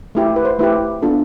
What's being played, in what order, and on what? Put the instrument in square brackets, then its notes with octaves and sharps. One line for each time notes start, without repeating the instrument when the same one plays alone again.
[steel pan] A3 E4 G4
B4
C5
A3 E4 G4 B4
B3 D4 F4 A4